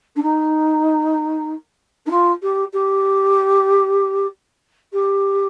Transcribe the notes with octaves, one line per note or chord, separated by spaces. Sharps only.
D4
D#4
D#4
F4
G4
G4
G4